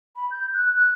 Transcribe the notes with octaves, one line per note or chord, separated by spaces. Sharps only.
B5
G6
F#6
F#6